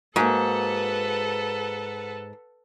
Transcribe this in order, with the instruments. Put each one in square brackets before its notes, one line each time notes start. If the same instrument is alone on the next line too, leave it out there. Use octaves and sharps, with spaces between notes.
[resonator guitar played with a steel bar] G#2 [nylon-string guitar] A#3 F#4 [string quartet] A4 B4 F#5